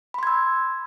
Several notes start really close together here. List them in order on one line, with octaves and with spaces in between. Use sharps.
B5 C6 G#6 E6